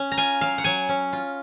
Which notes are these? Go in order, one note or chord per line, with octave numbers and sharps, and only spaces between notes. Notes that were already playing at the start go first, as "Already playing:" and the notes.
Already playing: C#4
A#5
F4 G#5
F#3 F5
F#5
F#3 G#5
C#4
F4